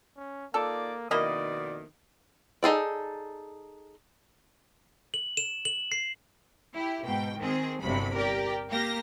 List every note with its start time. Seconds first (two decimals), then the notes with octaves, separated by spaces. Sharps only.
0.17 C#4
0.54 A#3 D#4 F4 A4 D5
1.11 F2 B2 D#3 A#3 E4 D5 D#5
2.63 D#4 G#4 A4 D5
5.14 F#7
5.37 E7
5.65 F#7
5.92 C7
6.73 E4 G4
7.05 G#2 B2 G5
7.39 D#3 C4 G#4
7.81 G1 C2 G2 C3 F#3 B5
8.15 G4 A#4 D5 G5
8.69 A#3 G4 A#6